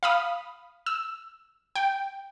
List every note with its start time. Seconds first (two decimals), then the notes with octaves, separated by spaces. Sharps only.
0.03 F5 B5 D#6
0.86 E6
1.76 G5